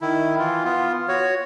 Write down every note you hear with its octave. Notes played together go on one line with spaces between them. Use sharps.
D#3 E4
E3 F4
B3 F4
F#4 C#5